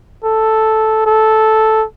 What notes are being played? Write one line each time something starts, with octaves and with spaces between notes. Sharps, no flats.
A4
A4